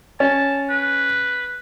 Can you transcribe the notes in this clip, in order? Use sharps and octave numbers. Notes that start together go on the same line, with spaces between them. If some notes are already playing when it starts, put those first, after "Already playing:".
C#4 A5
B4